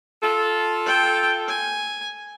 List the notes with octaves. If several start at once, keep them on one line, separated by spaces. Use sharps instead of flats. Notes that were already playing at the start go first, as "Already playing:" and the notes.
F4 A4
G5
G#5